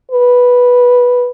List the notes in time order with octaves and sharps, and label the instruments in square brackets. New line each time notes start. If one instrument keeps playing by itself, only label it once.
[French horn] B4